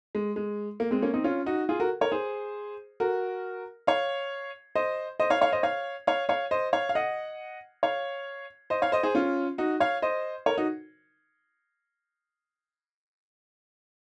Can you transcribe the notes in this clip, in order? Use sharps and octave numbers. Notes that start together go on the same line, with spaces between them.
G#3
G#3
A#3
G#3 C4
A#3 C#4
C4 D#4
C#4 F4
D#4 F#4
F4 G#4
F#4 A#4
A#4 C#5
G#4 C5
F#4 A#4
C#5 F5
C5 D#5
C5 D#5
C#5 F5
C#5 F5
C5 D#5
C#5 F5
C#5 F5
C#5 F5
C5 D#5
C#5 F5
F5
D#5 F#5
C#5 F5
C5 D#5
C#5 F5
C5 D#5
G#4 C5
C#4 F4
D#4 F#4
C#5 F5
C5 D#5
A#4 C#5
D#4 F#4